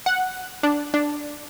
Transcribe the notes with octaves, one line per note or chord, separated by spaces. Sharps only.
F#5
D4
D4